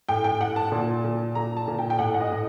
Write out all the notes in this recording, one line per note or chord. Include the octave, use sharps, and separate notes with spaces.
A2 G5
G5
A2 F#5
A5
A#2
A#2
A#2 A#5
A5
A#2
G5
G5
A2 F#5
F#5
D#5
A2